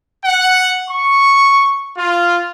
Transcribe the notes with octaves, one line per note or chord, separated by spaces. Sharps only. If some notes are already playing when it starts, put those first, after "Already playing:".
F#5
C#6
F4